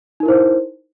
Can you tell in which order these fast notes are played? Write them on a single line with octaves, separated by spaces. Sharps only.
D#4 A#4 E4 C5